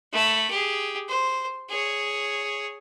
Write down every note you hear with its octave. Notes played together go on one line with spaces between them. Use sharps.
A3 B5
G4 G#4
C5
G#4 C#5